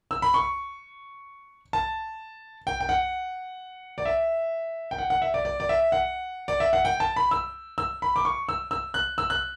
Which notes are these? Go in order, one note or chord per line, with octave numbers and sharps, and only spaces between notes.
E6
B5
C#6
A5
G5
G5
F#5
D5
E5
G5
F#5
F#5
E5
D5
D5
D5
E5
F#5
D5
E5
F#5
G5
A5
B5
E6
E6
B5
D6
C#6
E6
E6
F#6
E6
F#6